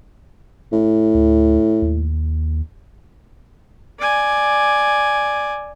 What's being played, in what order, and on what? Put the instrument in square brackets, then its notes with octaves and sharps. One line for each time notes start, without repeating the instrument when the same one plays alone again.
[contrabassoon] A2
[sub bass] D2
D#2
[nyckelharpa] D5 G#5